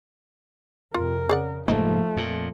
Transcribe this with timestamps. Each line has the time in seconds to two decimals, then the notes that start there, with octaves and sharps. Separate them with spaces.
0.94 F2 C3 F4 A#4
1.29 C#3 G#4 D5 F#5
1.68 F1 G#2 F3 A3 A#3 D#4
2.17 F2 A#2